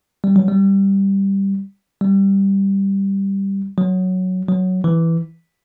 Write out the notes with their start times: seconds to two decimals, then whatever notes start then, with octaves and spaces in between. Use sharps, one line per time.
0.24 G3
0.36 F#3
0.48 G3
2.01 G3
3.78 F#3
4.48 F#3
4.84 E3